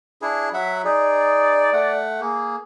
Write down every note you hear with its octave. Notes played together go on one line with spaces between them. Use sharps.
D4 E4 G#4
F#3 E5 F#5 B5
D#4 G#4 D5
A3 F#5
A#3 G#4